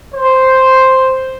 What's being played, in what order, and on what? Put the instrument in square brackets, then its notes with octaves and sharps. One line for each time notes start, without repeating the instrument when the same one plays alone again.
[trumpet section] C5